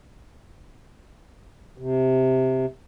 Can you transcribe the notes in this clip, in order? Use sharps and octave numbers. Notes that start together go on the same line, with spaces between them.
C3